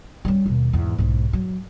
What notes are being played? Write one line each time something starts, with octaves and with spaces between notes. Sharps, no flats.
G3 C#4
D#2 B2
E2 G#2
B1 G#2
F#3